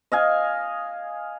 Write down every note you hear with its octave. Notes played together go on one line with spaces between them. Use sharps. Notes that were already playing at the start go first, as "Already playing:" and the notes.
D#5 F5 G#5